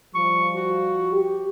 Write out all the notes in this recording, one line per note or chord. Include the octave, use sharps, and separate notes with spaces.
F3 G3 C#6
F#4
G4